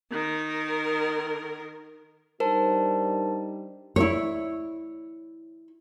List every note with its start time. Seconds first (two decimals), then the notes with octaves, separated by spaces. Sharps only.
0.11 D#3 A#4
2.40 G3 D4 D#4 A#4 C5 A5
3.96 E4 C#5